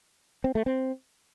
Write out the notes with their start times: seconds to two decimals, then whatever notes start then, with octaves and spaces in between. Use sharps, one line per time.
0.44 C4
0.55 A3
0.66 C4